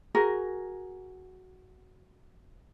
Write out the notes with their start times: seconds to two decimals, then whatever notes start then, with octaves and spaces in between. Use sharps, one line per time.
0.15 F#4 G#4 A#4